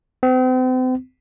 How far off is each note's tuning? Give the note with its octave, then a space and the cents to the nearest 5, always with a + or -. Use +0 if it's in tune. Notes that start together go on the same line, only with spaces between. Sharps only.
C4 -40